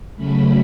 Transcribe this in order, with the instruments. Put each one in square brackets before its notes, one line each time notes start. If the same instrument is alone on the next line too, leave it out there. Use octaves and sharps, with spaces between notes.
[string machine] C#3 F#3 A3 C#4 B5